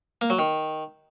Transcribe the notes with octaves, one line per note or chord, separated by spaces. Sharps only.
A#3
F#3
D#3